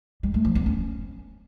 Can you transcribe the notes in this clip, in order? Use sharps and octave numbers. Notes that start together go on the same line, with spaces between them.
G3
A3
F3
B3
C#4